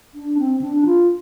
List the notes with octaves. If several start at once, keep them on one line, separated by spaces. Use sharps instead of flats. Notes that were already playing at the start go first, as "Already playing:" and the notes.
D4
C4
D4
F4